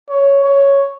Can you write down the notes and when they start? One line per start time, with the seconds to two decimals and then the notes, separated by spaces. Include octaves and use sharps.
0.09 C#5
0.44 C#5